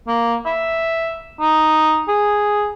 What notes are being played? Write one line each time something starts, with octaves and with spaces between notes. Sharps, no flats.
A#3
E5
D#4
G#4